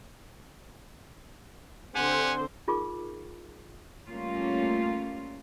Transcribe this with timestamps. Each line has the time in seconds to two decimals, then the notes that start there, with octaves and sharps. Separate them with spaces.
1.95 D3 C4 G4 C5 F#5 G#5
2.68 D#4 F4 G#4 A#4 C#6 D6
4.08 G3 A3 A#3 C#4 F4